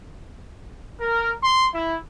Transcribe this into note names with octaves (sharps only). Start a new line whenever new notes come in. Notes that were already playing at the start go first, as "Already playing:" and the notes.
A#4
C6
E4